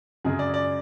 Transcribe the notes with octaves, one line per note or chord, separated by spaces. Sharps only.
F#2 C#3 G#3 G#4
D5
D5